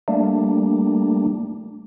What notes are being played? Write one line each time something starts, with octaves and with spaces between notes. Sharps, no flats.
G3 A3 A#3 D4